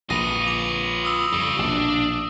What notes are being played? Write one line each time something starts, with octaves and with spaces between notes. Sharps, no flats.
A#1 F4 B4 D#6 A#6 D#7
D6 F7
D#6 E6
F2 C#3 G3
A#1 B2 D4